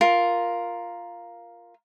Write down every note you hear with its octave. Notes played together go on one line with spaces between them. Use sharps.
F4 A#4